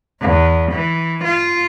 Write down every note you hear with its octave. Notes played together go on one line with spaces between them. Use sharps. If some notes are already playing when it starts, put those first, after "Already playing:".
E2
E3
F4